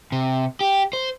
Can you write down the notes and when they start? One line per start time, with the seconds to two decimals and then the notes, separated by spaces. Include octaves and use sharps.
0.12 C3
0.61 G4
0.93 C5